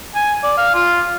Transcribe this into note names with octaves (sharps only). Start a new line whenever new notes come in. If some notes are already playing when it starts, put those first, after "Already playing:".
G#5
D5
F5
F4